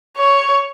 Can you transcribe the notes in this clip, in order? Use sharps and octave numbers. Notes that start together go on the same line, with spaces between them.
C#5